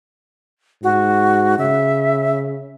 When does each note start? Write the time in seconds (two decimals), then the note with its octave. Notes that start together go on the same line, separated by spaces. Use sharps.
0.83 G#2 F#4
1.59 C#3 E5